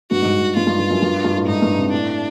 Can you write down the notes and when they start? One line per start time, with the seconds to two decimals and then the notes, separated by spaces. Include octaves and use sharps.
0.11 G2 F#4
0.22 G#2
0.25 G2
0.40 G#2
0.56 G2 F4
0.67 G2
0.79 G2
0.91 F#2
1.02 G2
1.25 G2
1.37 A2
1.46 G#2 D#4
1.62 G2
1.78 C3
1.92 A2 D4